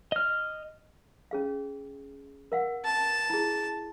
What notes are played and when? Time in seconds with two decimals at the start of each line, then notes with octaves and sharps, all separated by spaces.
0.12 D#5 F6
1.31 C#4 G#4 F5
2.52 A#4 F5 F#5
2.85 A5
3.30 E4 G#4